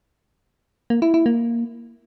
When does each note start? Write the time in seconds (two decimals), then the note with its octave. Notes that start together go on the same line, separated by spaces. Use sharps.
0.90 A#3
1.02 E4
1.14 E4
1.26 A#3